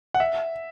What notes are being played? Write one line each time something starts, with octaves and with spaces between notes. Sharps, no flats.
F#5
E5